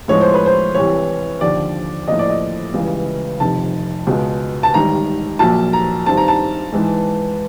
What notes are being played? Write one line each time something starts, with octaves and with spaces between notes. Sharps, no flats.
A2 F3 G#3 B3 C#5
C5
B4
C5
C2 C3 E3 G3 C#5
D#2 D3 F3 D5
A2 F3 A#3 D#5
D5
D#5
C#2 C#3 E3 G3
F1 F2 C3 D#3 A5
C#2 B2 G#3
A5
A1 G#2 D#3 G3 A#5
A#1 A#2 F#3 A#3 A5
A#5
G2 D#3 G3 C4 A5
A#5
A5
G#2 E3 G#3